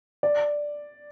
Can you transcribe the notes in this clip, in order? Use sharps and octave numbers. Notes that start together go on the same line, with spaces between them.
D5